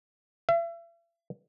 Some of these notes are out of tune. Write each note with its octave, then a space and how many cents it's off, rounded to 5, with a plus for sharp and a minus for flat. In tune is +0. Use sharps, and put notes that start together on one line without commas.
E5 +40